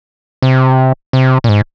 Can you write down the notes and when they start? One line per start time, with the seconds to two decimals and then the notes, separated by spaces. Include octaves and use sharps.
0.42 C3
1.13 C3
1.44 A#2
1.49 G#2